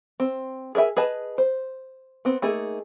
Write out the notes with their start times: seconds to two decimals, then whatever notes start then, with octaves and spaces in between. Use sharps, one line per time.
0.20 C4
0.75 G#4 A#4 D#5 E5 G#5
0.96 G#4 B4 D#5 A5
1.38 C5
2.25 B3 C4
2.42 A3 A#3 D#4 G#4